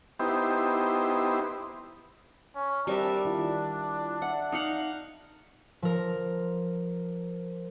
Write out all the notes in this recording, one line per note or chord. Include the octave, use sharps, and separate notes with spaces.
B3 D#4 E4 G4 C5
C#4
G3 C4 D4 A#4 C5 D5 E5
D#3 E4 F4
D5 E5 F#5
D#4 F5 F#5
F3 A#4